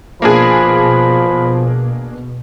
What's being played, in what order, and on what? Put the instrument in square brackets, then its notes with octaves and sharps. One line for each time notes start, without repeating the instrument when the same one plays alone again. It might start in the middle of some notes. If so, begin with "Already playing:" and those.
[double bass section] B2 [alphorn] F3 [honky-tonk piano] A#3 D4 G#4 [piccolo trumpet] B5